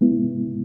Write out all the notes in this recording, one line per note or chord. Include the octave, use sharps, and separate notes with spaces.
G#3 B3 E4